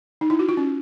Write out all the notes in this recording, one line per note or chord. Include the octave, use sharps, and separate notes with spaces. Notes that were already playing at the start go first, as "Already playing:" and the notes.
D#4
E4
F#4
F4
C#4